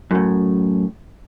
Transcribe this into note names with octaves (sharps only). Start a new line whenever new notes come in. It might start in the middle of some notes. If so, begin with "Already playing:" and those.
F#2 A2